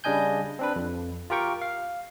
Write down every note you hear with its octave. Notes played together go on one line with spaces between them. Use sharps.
C#3 G3 D4 D#5 G#5 G6
C4 D4 B4
F2
F4 G4 A#4 G5 C#6
F5